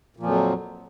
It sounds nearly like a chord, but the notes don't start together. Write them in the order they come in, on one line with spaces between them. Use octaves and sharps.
A#2 F3 F2 F#3